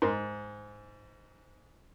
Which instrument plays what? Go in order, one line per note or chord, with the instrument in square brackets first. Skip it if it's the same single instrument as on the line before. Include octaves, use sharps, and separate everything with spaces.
[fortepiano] G#2 [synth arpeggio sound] A#4 C6